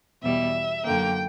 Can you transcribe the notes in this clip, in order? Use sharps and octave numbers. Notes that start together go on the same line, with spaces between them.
E2 B2 G3 E5
F#2 D3 A#3 G5